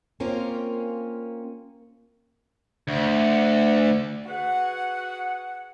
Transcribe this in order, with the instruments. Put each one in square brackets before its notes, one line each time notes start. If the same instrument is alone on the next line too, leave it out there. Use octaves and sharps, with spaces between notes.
[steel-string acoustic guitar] A#3 C4 C#4 F4 A#4
[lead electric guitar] D2
[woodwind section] F#4 G#4 B4 F#5